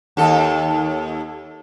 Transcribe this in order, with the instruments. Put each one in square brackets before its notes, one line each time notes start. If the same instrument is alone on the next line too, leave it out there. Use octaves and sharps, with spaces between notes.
[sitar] D#2 A4